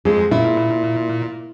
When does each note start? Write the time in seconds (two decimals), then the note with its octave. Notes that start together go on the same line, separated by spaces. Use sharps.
0.05 F2 G#3 G#4
0.31 A#2 E4